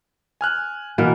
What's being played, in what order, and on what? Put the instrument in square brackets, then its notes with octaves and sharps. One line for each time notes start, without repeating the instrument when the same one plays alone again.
[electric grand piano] G#5 F6 F#6
[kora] B2 E3 A#3